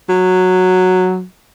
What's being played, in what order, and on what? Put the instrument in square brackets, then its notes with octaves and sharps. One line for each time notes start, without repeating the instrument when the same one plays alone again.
[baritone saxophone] F#3